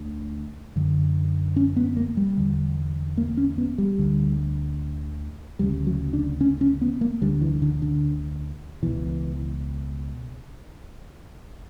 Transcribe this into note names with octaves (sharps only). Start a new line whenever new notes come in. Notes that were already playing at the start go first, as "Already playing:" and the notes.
Already playing: D2 D3
F#2 D3
C#4
B3
A#3
G3
E2 D3
A#3
C#4
B3
G3
D2 D3
D2 C#3 G3
F#3
D4
C#4
C#4
B3
A#3
D2 D3 G3
E3
D3
D3
C#2 B2 E3